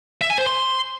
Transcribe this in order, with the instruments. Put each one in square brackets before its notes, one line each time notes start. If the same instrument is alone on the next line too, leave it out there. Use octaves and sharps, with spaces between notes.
[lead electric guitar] E5
G#5
C5
C6